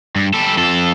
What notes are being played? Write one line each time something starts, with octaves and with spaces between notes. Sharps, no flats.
G2
G3 A4
F2 A4